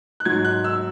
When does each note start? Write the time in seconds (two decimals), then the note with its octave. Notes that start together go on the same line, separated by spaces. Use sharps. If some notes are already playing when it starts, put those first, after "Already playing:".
0.20 F#6
0.25 G#2 F#3 G#6
0.45 F#6
0.64 E6